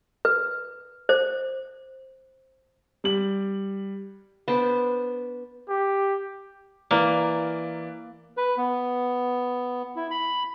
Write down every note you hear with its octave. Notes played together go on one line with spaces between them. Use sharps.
B4
C5
G3 F#7
B3 D4 C5
G4
E3 A#3 D5
B4
B3
E4
B5